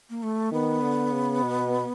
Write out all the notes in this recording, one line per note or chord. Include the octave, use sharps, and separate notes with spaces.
A#3
A3
D#3 B3
D3
C#3
B2